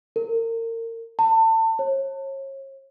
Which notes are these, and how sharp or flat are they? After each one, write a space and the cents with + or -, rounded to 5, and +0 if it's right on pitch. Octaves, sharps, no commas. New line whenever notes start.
A#4 -35
A5 +30
C#5 -35